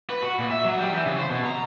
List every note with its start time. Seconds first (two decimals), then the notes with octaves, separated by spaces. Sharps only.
0.10 B4
0.22 F#4
0.39 A#2
0.51 E5
0.65 F#3
0.79 G3
0.92 E3
1.06 C#3
1.19 C5
1.30 B2
1.46 A#5